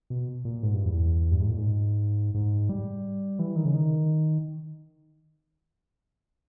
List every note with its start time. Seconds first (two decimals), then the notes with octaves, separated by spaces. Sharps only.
0.10 B2
0.45 A#2
0.63 G#2
0.74 G2
0.85 E2
1.32 G2
1.40 G#2
1.49 A#2
1.58 G#2
2.35 G#2
2.69 G3
3.39 E3
3.56 D#3
3.65 C#3
3.74 D#3